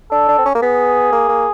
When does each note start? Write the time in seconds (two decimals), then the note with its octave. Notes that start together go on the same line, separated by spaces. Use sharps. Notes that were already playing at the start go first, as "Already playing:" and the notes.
0.11 D4 A4
0.29 D4
0.38 C4
0.45 C#4
0.55 A#3
0.62 B3 G#4
1.12 A#3
1.29 A#3